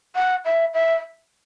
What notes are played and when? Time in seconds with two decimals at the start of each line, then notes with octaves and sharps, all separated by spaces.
0.15 F#5
0.45 E5
0.74 E5